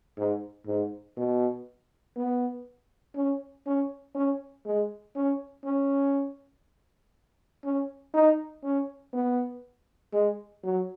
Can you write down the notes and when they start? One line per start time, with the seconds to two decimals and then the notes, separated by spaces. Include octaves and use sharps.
0.18 G#2
0.67 G#2
1.17 B2
2.16 B3
3.15 C#4
3.66 C#4
4.15 C#4
4.66 G#3
5.16 C#4
5.65 C#4
7.65 C#4
8.14 D#4
8.63 C#4
9.13 B3
10.13 G#3
10.64 F#3